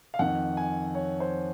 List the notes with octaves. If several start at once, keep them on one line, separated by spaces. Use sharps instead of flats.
F5
F2 D#3 F#5
G#5
C#5
C5